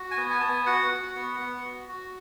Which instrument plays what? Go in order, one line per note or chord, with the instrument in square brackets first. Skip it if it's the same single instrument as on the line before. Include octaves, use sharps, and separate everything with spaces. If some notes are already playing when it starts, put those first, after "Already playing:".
Already playing: [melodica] F#4
G#5
B3
G#5
B3 A5
G#5
F#4 F#5
F#4
B3
B3
F#4
F#4